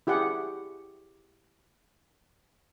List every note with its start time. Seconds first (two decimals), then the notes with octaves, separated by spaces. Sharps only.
0.07 E4 G4 G#4 F#5